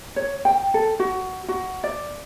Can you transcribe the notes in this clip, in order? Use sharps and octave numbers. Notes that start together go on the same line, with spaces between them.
C#5
G5
A4
F#4
F#4
D5